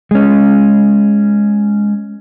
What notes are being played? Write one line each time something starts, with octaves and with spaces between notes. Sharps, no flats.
G#3 C#4